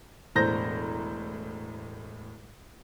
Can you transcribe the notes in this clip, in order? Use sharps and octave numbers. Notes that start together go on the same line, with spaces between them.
E1 A2 C5 A#5 G6 A#6